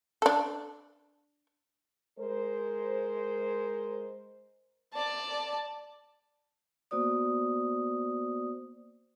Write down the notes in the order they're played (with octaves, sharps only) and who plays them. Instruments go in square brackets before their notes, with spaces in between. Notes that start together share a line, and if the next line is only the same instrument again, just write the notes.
[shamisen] D4 A4
[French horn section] G#3 A#4 C5
[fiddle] D5 A5
[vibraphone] A#3 B3 F#4 C5 D5 D#6